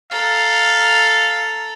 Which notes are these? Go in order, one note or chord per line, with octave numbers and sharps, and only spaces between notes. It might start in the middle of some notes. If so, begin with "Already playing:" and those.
A4 F5 A#5